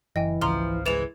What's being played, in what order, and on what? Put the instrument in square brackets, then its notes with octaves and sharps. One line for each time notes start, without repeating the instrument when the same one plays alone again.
[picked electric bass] F#1 [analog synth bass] E3 [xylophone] D#5 G5 G#5
[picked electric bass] G#1 C#2 C#3 [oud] F3 [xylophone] A#5 C6 F6
[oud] E3 G#3 [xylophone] A6 E7 F7